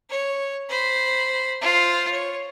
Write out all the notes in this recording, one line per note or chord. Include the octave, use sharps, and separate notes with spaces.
C#5
C5 B5
F4 C5
C#5